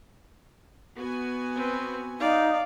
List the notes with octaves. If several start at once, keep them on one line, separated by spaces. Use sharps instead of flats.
B3 F#4 G#5
C4 B4
D#4 D5 F5